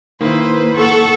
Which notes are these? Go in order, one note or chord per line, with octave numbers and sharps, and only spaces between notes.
D#3 A#3 E4 B4 C5
A4 F#5 C#6